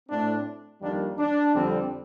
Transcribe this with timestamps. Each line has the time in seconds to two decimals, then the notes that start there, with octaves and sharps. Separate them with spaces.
0.09 A2 A3 C4 D4
0.81 F2 D#3 G3 A#3 D4
1.18 D4
1.54 F2 D3 G3 C4